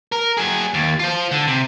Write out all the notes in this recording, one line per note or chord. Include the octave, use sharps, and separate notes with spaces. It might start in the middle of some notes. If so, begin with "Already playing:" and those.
A#4
F#3 G#4
D#2
F4 C5
D3
C3